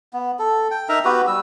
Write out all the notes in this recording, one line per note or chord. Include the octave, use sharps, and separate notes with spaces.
B3
A4
G5
D#4 A#4 E5 A#5
B3 F#4 G4 B4
G3 E6